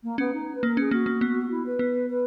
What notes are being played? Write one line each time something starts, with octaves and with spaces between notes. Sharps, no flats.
A#3
B3 C#4
D#4
B4
A#3 A#4
C#4 G#4
A#3 F#4
A#3
B3
E4
B4
B3
B4